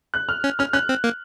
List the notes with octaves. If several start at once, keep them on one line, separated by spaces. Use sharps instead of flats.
F#6
F6
C#4
C#4 F6
C#4 F#6
C4
A#3